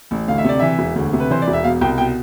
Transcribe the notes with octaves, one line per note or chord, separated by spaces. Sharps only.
A1
D2 F5
E5
C3 D5
E3 E5
E1
D2
C3
B4
E3 C5
D5
E1
E5
B2 F5
C2 G5
B2 G5